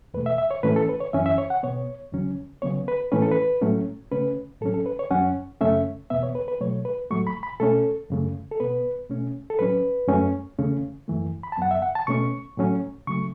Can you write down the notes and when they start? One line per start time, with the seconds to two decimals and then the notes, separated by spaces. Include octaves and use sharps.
0.14 E2 B2 A3 B4
0.26 E5
0.38 E5
0.51 C#5
0.63 A2 E3 A3 C#4 B4
0.76 A4
0.89 B4
1.01 C#5
1.13 F#2 E3 C#4 E5
1.26 E5
1.38 C#5
1.50 F#5
1.63 B2 B3 C#5
2.13 E2 C#3 F#3 C#4
2.62 C#3 F#3 B3 C#5
2.88 B4
3.12 A2 E3 A3 C#4 B4
3.22 A4
3.31 B4
3.61 A2 F#3 A3 C#4
4.12 C#3 A3 C#4 B4
4.61 A2 F#3 C#4 A4
4.74 A4
4.86 B4
4.99 C#5
5.11 F#2 F#3 C#4 F#5
5.61 F#2 C#3 A3 C#4 E5
6.10 E2 B2 B3 E5
6.23 C#5
6.35 B4
6.48 B4
6.61 B2 F#3 A3 C#5
6.85 B4
7.11 A2 F#3 A3 C#6
7.27 B5
7.43 B5
7.60 B2 A3 C#4 A4
8.10 F#2 C#3 A3
8.51 A4
8.60 B2 B3 B4
9.09 B2 A3 C#4
9.50 A4
9.59 A2 F#3 C#4 B4
10.08 F#2 F#3 A3 C#4
10.58 E2 C#3 A3 C#4
11.08 F#2 E3 A3
11.43 B5
11.52 A5
11.57 F#2 F#3 B3 F#5
11.71 E5
11.82 F#5
11.95 A5
12.07 B2 A3 C#4 C#6
12.57 A2 F#3 A3 C#4
13.07 C#3 F#3 A3 C#6